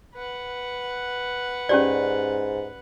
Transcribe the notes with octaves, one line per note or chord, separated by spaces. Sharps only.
B4 F#5
G#2 C#4 G4 D5